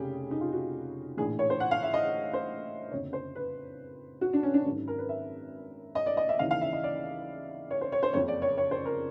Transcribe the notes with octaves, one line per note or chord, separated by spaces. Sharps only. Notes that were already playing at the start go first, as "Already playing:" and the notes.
Already playing: F1 C#3 G4 G#4
D#4
F4
F#4
A#1 A2 E3 G#4
C#5
C5
F#5
F5
E5
D#5
C5
F#1 F2 D3 C#5
C5
B4
F#4
D4
C#4
D4
G#1 F#2 D#3
A#4
B4
E5
D#5
D5
D#5
E5
D#2 C#3 E3 F5
F5
E5
D#5
D5
C#5
C5
C#5
C5
F#1 F2 C#3 F3 C#5
D5
C#5
C#5
C5
A#4